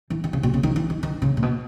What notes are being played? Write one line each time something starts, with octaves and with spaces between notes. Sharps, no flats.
E3
D#3
C#3
B2
C#3
D#3
E3
D#3
D#3
C#3
A#2
B2